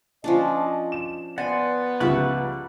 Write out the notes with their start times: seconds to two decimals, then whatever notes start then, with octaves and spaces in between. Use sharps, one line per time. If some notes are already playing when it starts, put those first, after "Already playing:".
0.24 F3 C#4 D4 D#5
0.92 E7
1.38 B3 C5 D5 F#5 G#5
2.00 C#2 F3 G3 B4 D5 E5 F#5 C#6